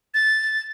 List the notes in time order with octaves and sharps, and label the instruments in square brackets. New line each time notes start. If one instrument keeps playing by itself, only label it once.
[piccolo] A6